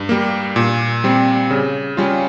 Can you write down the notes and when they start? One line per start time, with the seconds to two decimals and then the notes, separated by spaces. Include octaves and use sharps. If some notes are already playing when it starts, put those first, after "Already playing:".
Already playing: G2
0.09 G3 A#3
0.56 A#2
1.04 G3 C4
1.50 C#3
1.97 G3 C#4 F4